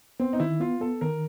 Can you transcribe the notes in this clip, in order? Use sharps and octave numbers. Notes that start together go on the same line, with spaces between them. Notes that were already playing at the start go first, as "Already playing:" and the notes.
B3 C4
D#4
D#3 E4
B3 F4
B3 A4
D#3 A#4